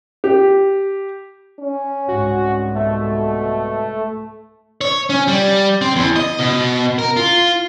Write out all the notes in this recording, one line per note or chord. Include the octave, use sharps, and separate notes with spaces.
G4
C#4
C2 G#2 F#4
B2 A3
C#5
C#4
G3
C4
E2
D#5
B2
A#4
F4